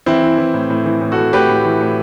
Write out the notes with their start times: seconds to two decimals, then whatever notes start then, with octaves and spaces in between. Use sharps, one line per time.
0.06 E3 C4 E4
0.22 E3
0.38 E3
0.54 A2
0.70 A2
0.86 E3
1.01 A2
1.12 F#4 A4
1.18 A2
1.33 A2 G4 B4
1.49 A2
1.65 E3
1.81 A2